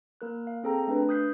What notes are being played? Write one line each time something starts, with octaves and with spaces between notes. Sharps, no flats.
A#3 A#4 F#6
F5
C4 G#4 A4 G5 A#5
A3 D4 B4
D#6 F#6 G6 B6 C7